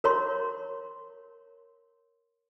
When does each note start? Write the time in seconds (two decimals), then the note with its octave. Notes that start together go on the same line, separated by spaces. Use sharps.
0.04 A#4 C#5 C6